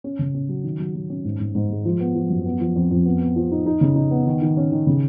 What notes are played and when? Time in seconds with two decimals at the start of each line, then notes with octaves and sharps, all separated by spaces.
0.04 C#4
0.19 C#3
0.35 C#4
0.49 F#3
0.64 D#3
0.79 F#3
0.95 F#3
1.10 C#4
1.25 G#2
1.40 G#2
1.55 G#2
1.70 G#3
1.85 F3
2.00 B3
2.15 F3
2.30 F#2
2.45 B3
2.60 F3
2.76 F2
2.91 F2
3.05 B3
3.21 B3
3.36 F3
3.52 D#4
3.66 D#4
3.81 C#3
3.96 D#4
4.11 B3
4.26 D#3
4.42 D#3
4.57 C#4
4.71 D#3
4.87 C#3